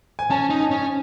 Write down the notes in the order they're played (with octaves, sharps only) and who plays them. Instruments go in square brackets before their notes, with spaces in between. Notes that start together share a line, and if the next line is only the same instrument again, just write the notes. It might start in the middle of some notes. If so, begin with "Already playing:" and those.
[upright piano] G#5
[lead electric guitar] C#4 [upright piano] A5
[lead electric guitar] D#4
[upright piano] G#5
[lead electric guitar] C#4